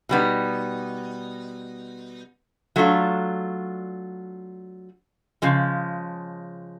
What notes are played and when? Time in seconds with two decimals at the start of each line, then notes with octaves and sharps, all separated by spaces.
0.09 B2 G3 B3 D#4
2.76 F#3 A3 D4 F4
5.42 C#3 F3 G#3